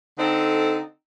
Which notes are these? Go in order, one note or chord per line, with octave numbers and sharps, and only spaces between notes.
D3 C4 D#4 A4